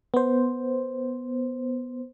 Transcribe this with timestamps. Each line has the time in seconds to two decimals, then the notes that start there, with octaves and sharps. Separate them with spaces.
0.14 B3 C5